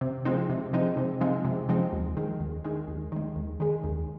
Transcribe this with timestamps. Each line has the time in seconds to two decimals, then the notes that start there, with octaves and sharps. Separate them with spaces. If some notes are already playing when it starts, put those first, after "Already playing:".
0.01 C3
0.25 F3 G#3 C4 D#4
0.49 C3
0.73 F3 G#3 C4 D#4
0.97 C3
1.21 F3 G#3 C4 D#4
1.45 C3
1.69 F3 G#3 C4 D#4
1.93 D#2
2.17 D#3 G#3
2.40 D#2
2.64 D#3 G#3
2.88 D#2
3.12 D#3 G#3
3.36 D#2
3.60 D#3 G#3
3.84 D#2